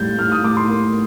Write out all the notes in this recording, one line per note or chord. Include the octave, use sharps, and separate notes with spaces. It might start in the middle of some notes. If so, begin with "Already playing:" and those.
Already playing: A2 G3 G6 A6
A2 F6
D#6
A2 D6
C6
A#3